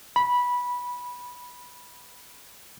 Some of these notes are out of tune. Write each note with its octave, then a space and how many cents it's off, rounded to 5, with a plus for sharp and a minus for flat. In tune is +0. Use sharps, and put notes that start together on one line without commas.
B5 -15